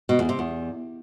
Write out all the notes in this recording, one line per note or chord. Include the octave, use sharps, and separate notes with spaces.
B2
E2
C3
E2